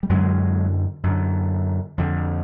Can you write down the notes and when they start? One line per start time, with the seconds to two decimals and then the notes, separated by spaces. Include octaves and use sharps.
0.03 G3
0.10 F#2 D3 F#3 G#3
1.03 F#2 D3
1.98 F2 D3